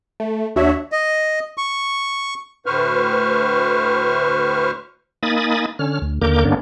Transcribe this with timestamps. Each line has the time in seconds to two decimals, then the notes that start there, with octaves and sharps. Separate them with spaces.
0.20 A3
0.56 D#2 D4 F#4 C#5 E5
0.92 D#5
1.58 C#6
2.66 D2 A2 B4 C5 C#6 F6
5.23 A#3 D#4 G#5 B5 D#6 A6
5.79 D3 C#4 F6
6.02 D2
6.22 D#2 D3 A#3 A#4 D6 G6
6.45 G2 D3 A#3 B3 C#4 D4